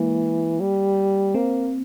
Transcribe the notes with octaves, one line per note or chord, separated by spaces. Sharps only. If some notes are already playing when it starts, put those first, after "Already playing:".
Already playing: E3 G#3 A#3
G3
A#3 C4